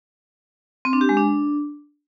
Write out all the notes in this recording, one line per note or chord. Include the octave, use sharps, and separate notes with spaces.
C4
D4
G4
G#3
D4